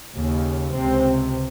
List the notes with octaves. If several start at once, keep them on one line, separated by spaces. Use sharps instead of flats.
D#2 C#3
C#2 C3 C4